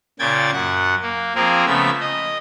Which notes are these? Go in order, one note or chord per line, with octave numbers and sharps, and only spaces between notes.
A#2 C#3 G5 G#6 A6
F#2 F#5
A#3
F3 A#3 C4 G#4 A#4
C#3 F3 A3 B3 E6
D#5